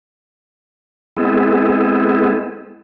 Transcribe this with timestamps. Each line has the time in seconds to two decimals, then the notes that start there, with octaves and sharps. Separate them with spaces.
1.17 G#3 B3 C4 E4 G#4 A4